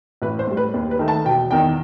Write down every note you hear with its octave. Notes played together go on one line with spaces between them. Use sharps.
A1 B4
C5
A2 G3
B4
D#2
B4
D#3 A3
A5
E1 G5
E2 D#3 G5